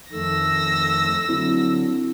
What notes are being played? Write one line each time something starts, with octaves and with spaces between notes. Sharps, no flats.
F2 D#3 A3 E6 A#6
D3 F#3 C4 E4